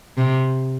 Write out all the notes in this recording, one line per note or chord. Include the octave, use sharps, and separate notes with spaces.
C3